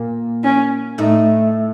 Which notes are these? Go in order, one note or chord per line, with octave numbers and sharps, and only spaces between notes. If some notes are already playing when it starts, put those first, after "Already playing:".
Already playing: A#2 A#3
C#4
A2 A3 D#4